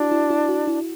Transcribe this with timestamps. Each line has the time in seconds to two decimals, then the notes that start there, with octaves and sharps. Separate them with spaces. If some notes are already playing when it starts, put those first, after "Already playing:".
Already playing: D4 E4 F#4
0.11 E4
0.30 E4
0.49 F#4
0.67 E4